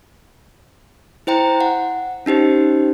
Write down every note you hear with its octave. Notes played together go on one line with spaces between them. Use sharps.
E4 C5 G5 A#5
F#5
C#4 D#4 G4 C5